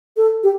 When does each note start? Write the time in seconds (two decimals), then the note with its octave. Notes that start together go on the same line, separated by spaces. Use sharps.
0.17 A4
0.43 G4